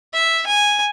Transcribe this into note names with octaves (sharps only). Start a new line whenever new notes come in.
E5
G#5